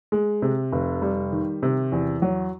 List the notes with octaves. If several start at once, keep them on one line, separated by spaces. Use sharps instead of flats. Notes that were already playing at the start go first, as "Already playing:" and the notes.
G#3
C3
F1
G3
D#3
C3
E2
F#3